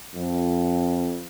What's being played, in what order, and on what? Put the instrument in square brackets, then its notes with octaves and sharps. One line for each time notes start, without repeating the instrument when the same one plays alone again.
[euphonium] F2